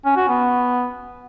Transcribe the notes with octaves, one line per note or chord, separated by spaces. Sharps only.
C#4
F#4
B3